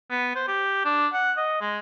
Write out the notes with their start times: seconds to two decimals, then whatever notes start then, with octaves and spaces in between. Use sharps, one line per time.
0.11 B3
0.35 C5
0.48 G4
0.85 D4
1.13 F#5
1.37 D#5
1.61 G#3